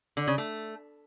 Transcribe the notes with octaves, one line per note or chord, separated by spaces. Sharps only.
D3
C#3
A3